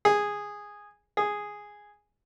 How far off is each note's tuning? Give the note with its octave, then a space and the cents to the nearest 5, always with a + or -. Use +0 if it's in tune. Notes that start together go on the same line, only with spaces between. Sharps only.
G#4 -10
G#4 -5